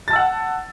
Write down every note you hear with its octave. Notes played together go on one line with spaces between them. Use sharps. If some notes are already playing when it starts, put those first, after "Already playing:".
F#5 A5 E6 A6